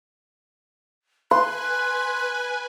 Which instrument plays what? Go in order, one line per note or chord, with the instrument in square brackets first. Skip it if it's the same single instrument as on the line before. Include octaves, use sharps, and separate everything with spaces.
[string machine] B4 G#5 [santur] C6 [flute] F#6